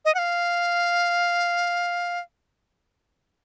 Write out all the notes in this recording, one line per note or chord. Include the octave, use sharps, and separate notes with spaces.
D#5
F#5
F5